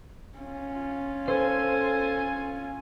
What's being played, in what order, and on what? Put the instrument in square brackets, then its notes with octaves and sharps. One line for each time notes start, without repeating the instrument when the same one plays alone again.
[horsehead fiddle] C#4 F4
[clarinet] A4 [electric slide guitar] C5 [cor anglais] G#5